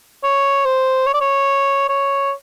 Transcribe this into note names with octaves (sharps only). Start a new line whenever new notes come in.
C#5
C5
C#5
D5
C#5
C#5